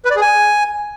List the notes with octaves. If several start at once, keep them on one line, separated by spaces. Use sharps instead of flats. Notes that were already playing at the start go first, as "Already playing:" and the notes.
B4
D5
G#4
G#5